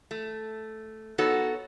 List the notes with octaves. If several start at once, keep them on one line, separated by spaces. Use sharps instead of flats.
A3
B3 D#4 F#4 A4 C#5